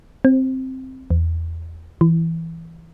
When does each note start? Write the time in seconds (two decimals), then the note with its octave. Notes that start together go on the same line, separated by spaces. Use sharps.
0.25 C4
1.10 E2
2.01 E3